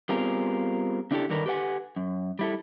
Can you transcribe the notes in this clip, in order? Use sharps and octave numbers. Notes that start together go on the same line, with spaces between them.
G3 B3 C4 F4 G#4 A#4
C#3 D4 E4 F4 G4 A4
G2 D3 D#3 D4 A#4 B4
G4 A4 B4 C5 F#5 G#5
F#2
G3 E4 A4